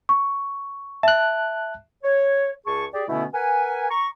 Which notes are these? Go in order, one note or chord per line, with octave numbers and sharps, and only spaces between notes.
C#6
E5 A5 F#6
C#5
C#2 G#4 A5 C#6
G4 G#4 D5
B2 D3 A3 B3 C#4 E4
A#4 B4 F#5 G#5
A#5 C#6